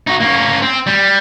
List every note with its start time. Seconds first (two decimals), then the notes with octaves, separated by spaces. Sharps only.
0.07 D#4 F#4
0.20 A#3 C#4
0.62 C4
0.87 G3